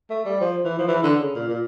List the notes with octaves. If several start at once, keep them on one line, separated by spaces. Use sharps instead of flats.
A3
G3
F3
E3
F3
E3
D3
C#3
A#2
A#2